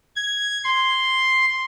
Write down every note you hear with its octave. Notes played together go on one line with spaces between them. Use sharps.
G#6
C6